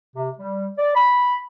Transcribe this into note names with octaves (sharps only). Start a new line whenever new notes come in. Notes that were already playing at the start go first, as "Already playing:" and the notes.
C3
G3
D5
B5